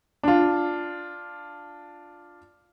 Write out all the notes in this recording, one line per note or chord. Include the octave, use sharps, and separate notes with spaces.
D4 F4